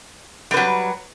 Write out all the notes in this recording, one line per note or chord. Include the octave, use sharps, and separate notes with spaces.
F#3 G3 B4